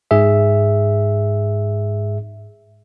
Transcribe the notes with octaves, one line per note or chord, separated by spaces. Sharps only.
G#2 G#4 E5